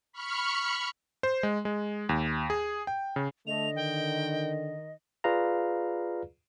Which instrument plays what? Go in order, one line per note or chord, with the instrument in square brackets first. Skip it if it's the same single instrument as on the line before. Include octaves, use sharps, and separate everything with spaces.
[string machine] B5 C#6 F6 C#7
[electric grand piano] C5
G#3
G#3
D#2
G#4
G5
C#3
[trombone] D3 [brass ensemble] A3 [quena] D#5 [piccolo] F7
[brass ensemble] D#3 [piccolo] G5
[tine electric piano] F4 G#4 B4 D5 F5 A#5